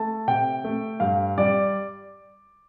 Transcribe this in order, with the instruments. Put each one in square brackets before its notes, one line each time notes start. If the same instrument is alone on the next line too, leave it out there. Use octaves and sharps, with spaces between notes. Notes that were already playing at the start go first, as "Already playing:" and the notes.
Already playing: [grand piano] A3 A5
C3 G5
A3
G2 F5
G3 D5